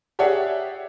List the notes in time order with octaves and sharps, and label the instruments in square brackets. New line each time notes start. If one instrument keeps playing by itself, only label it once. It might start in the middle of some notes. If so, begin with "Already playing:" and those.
[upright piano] G4 G#4 C#5 D5 E5 F#5